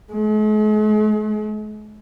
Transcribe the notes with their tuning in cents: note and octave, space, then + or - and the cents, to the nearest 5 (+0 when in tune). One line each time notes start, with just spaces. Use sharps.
G#3 +45